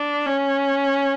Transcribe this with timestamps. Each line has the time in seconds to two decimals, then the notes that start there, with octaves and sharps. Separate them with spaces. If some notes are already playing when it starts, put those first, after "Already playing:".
Already playing: D4
0.26 C#4